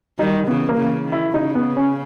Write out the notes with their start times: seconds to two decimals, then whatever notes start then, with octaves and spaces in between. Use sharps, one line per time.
0.19 D#3 G3 D#4
0.47 C#3 E3 B3
0.69 A#3
0.76 C#3 E3
1.05 D#3
1.12 E4
1.33 C#3 D#4
1.55 B3
1.77 C#4